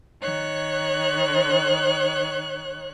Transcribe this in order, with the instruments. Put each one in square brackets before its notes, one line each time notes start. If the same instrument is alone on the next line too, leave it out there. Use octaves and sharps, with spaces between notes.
[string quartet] D#3 C#5 F#6